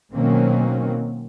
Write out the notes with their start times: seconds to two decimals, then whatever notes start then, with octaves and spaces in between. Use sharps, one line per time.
0.13 B2 D#3 F#3 A#3 C4 C#4